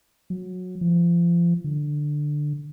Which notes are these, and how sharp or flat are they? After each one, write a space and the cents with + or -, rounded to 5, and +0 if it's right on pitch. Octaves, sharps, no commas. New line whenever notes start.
F#3 -20
F3 -30
D3 +10